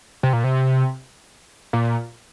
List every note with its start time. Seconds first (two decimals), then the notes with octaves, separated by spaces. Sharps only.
0.23 C3
0.33 A#2
0.44 C3
1.73 A#2